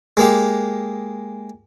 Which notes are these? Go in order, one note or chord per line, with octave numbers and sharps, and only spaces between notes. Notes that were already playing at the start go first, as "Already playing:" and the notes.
G#3 A#3 G4